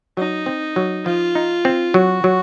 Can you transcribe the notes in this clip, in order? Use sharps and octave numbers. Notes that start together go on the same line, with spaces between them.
F#3 D#4
C4
F#3
F3 F4
D#4
C4
F#3 F#4
F#3